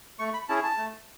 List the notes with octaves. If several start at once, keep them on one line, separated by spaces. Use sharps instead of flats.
A3 C#6
B5
C#4 E4 G#4 A5
A5
A3